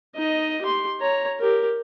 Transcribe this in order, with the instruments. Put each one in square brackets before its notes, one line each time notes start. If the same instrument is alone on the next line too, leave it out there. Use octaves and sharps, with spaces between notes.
[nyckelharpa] D#4 D#5
G4 C6
C#5 A#5
G4 A#4